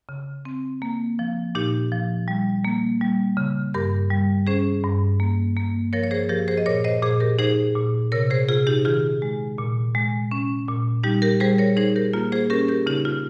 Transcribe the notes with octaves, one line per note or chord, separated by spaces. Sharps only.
C#3
C4
A#3
F3
A#2 D#4 G4
F3
G3
A#3
G3
C#3
G2 G4 A#4
G3
C#4 G#4 C5
G2
A#3
A#3
F3 A#4 C#5
C#5
G#4 C5
F3 G4 A#4
G#4 C5
D#5
A#2 A#4 C#5
C5 D#5
A#2 G#4 C5
G4 A#4
D#4 G#4 C5
A#2
C3 A#4 C#5
G#4 C5
C3 F4 G#4
D#4 G4
D#3 F4 G#4
G#3
A#2
G#3
C#4
A#2
G3 D#4 G4
G4 A#4
G3 G#4 C5
A#4 C#5
D#4 G#4 C5
G4 A#4
A#3 F4
G#4 C5
C#4 G4 A#4
G4 A#4
C#3 D#4 G4
F4